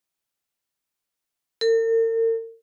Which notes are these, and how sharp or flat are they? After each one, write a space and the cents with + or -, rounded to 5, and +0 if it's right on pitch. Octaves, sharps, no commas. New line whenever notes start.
A#4 -45